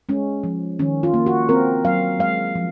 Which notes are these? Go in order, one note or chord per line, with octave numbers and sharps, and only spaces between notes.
G#3 C#4
F3
D#3 C#4
F4
A#3
F#4
C4 A#4
F#3 F5
G#3 F5
F3